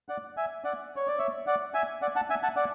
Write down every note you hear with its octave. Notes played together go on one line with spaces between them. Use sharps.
D5 F#5
E5 G#5
D5 F#5
C#5
D5
C#5 E5
D5 F#5
E5 G#5
D5 F#5
F#5 A5
E5 G#5
F#5 A5
D5 F#5